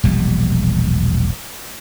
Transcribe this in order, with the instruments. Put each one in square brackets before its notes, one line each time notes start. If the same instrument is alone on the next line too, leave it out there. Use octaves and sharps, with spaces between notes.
[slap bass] E1 A#1 G3